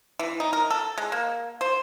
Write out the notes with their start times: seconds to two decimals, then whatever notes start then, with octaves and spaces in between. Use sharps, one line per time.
0.19 E3
0.40 D#4
0.53 A#4
0.70 A4
0.98 G#3
1.12 A#3
1.61 C5